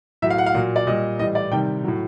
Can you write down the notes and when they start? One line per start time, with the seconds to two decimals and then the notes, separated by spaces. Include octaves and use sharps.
0.22 A2 F#3 E5
0.30 F5
0.38 F#5
0.46 F5
0.54 A#2 F#3
0.76 D5
0.87 A#2 G3 D#5
1.19 A2 E3 G3 D#5
1.35 D5
1.51 C3 D#3 G3 G5
1.84 A2 F#3